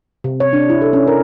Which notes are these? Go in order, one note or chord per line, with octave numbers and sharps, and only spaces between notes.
C3
C#5
D4
E4
A4
C#4
A#4